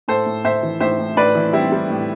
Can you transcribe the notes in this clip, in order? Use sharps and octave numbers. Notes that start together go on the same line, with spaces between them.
A2 A4 C5
A2
A2 C5 E5
E3
A2 C5 E5
A2
A2 B4 D5
E3
G3 C4 E4
G3
A2